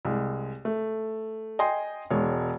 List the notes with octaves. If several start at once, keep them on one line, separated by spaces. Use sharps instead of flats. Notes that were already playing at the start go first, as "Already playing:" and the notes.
C2 G#3
A3
D#5 G5 G#5 C6
E1 G#3 C#5